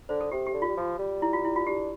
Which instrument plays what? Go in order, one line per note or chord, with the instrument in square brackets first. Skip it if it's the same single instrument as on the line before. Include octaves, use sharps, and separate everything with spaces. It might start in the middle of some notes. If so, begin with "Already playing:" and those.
[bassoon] D3 [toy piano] C5
[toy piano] A4
[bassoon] C3 [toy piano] G4
[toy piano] G4
[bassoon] D3
[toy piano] F4
[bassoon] G3
F3
G3
[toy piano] E4
F4
E4
F4
[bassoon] D4 [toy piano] G4